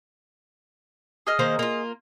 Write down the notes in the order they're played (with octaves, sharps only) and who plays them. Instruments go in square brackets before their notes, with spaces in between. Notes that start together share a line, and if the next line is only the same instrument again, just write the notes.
[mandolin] G#4 D#5 F6
[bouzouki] D#3 A#3 C5
A#3 F4